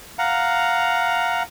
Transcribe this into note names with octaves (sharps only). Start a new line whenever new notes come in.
F5 F#5 A#5